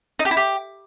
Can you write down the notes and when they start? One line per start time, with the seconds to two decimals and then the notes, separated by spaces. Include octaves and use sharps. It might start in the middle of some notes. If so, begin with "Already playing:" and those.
0.19 D#4
0.25 G4
0.31 E4
0.37 G4